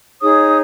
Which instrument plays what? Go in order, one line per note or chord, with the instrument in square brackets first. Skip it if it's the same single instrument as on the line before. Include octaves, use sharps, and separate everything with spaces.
[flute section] D#4 G#4 C#5 D#6